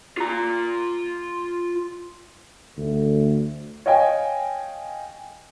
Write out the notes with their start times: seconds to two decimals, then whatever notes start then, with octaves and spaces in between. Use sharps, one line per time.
0.17 F4 A#5
2.77 D2
3.86 C#5 D#5 F5 G5 G#5